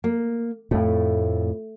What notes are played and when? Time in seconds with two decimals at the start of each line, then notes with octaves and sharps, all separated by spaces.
0.04 A#3
0.71 F2 A2 A3